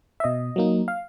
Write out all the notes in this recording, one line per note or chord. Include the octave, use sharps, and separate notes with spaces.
E5
B2 D#5
F#3 A#3 D#4
F5